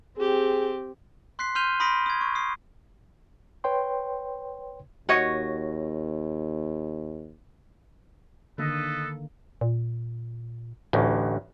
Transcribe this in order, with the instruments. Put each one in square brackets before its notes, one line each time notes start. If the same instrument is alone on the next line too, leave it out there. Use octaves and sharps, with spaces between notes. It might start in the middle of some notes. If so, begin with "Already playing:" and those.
[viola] C4 G4 [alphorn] G#4
[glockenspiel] C6 F#6 B6 C7
C6 F6 G6 D#7 F7 G7
B5 C6 D#6 A#6 B6 D7
D#6 G#6
C#6
D#6 C7
[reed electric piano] B4 C#5 G5 C6
[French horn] D#2 [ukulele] F#4 C#5 D#5
[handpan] D3 D#3 A#3 [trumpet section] A4 B4 D#5
[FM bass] A#2
[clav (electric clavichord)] A1 D2 [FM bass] A2